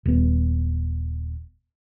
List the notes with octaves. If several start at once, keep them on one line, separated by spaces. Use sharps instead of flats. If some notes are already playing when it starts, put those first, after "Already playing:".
D#1 B3